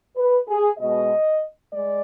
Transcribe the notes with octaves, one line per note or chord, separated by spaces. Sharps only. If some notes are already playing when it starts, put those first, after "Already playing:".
B4
G#4
B2 G#3 D#5
G#3 D5